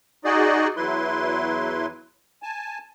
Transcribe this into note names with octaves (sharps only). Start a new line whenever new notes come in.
D#4 F#4 G#4 D5 D#5
E2 F#3 E4 B4 C6
G#5 A5